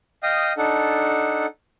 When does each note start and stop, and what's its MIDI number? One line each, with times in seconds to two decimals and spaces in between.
0.23 0.53 75
0.23 0.53 77
0.23 0.53 79
0.23 0.53 87
0.57 1.46 62
0.57 1.46 63
0.57 1.46 69
0.57 1.46 78